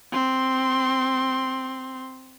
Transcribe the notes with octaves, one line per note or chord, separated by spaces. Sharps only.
C4 C6